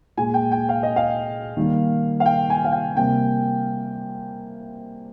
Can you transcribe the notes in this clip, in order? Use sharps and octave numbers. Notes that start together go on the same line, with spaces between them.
A#2 G#3 G#5
G5
G5
F5
D#5
F5
D#3 G3 A#3
F5
G5
G#5
F5
G5
C3 G3 A#3 G5